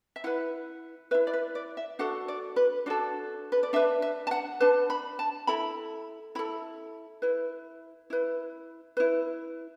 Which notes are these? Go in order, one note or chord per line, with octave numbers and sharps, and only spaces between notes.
E5
E4 B4 F#5
E4 B4 E5
D5
B4
D5
E5
D4 F#4 A4 F#5
D5
B4
D4 F#4 A4 D5
B4
D5
D4 B4 E5
E5
A5
F#5
D4 B4 A5
B5
A5
E4 A4 B5
E4 A4 B5
E4 B4
E4 B4
E4 B4